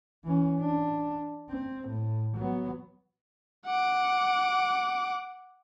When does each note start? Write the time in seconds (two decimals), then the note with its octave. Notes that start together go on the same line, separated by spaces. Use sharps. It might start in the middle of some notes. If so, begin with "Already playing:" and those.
0.24 E3 C#4
0.60 D4
1.50 C4
1.88 A2
2.37 F#3 B3
3.66 F#5 D6